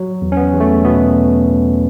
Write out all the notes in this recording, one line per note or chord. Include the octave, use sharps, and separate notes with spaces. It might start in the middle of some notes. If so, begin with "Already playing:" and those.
Already playing: F#3
E2
C#4
B3
E2
A3
B2 B3